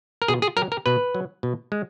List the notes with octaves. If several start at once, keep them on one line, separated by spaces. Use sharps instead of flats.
A#4
B2 G#4
G#4
F#3 A#4
A#4
B2 B4
F#3
B2
G#3